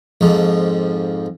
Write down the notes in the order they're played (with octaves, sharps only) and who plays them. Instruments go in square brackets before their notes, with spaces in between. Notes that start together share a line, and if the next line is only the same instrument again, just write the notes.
[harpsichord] F2 G#2 F3